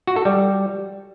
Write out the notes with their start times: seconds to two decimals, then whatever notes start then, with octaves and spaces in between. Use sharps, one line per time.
0.07 F#4
0.16 A4
0.25 G3